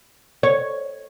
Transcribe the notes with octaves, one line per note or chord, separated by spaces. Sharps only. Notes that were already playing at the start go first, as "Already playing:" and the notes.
C#5